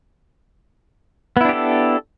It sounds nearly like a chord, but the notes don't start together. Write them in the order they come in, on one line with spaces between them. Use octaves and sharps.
B3 E4 D4 G4 A4